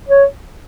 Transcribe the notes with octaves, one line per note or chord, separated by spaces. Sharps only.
C#5